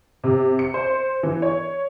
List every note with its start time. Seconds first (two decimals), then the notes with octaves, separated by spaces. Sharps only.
0.24 C3
0.59 C#7
0.74 C5
1.23 E3
1.42 C#5